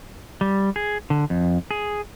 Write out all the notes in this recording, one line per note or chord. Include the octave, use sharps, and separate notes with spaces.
G3
G#4
D3
F2
G#4